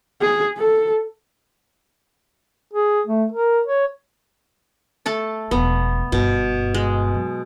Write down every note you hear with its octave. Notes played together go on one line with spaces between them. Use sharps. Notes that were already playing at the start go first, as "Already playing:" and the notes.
G#4
A4
G#4
A3
A#4
C#5
A3 A4 A5
E1 F3 B3
G1 G2 B2
G#3
F#3